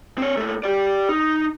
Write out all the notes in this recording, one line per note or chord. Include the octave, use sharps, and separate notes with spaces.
C4 C#5
A#2 A3
G4 D5
D#4